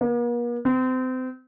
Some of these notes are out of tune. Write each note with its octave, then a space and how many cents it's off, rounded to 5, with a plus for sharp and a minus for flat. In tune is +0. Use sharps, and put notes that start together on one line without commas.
A#3 +45
C4 -30